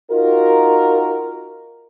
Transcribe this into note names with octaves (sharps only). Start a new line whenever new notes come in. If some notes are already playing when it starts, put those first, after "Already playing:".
D#4 F4 F#4 A#4